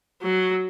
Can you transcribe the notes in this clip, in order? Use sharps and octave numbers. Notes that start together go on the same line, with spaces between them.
F#3